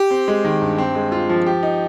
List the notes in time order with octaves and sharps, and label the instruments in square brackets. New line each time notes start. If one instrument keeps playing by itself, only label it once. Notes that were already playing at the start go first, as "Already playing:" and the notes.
Already playing: [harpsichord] G4
[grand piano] C4
G#3
D#3
G2
C4
G#3
F4
F3
G4
D#4